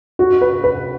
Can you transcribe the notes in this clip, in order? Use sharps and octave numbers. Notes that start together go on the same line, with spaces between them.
F#4
B4
B4